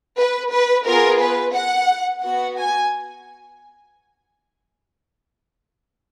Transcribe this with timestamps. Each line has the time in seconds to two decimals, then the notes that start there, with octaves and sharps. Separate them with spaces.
0.18 B4
0.52 B4
0.86 B3 F4 G#4 A#4
1.20 B4
1.54 F#5
2.23 B3 F#4 F#5
2.57 G#5